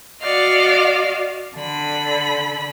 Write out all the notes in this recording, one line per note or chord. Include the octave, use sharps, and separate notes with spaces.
F#4 D5 D#5 F5
D3 B5